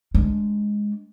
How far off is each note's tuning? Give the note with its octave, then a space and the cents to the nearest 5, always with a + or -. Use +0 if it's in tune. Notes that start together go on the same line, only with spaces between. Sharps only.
G#3 +0 D4 +0